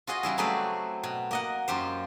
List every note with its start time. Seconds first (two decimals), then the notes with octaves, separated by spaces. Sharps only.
0.07 F4 F#4 G#4 D#5
0.23 C#3 G3 E4 G#4
0.38 F#3 A3 C4 G#4 B4 D5
1.03 B2
1.31 A#3 D#5 F#5
1.68 F#2 F4 G4 C5